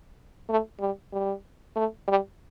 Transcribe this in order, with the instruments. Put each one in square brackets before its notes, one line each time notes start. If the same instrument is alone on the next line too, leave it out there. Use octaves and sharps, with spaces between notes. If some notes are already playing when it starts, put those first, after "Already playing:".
[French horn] A3
G3
G3
A3
G3